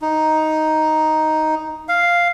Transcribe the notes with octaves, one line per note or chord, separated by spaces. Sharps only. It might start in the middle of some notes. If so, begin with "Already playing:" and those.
D#4
F5